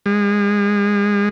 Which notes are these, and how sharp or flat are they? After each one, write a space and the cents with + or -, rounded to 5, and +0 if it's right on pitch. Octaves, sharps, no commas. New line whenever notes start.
G#3 -30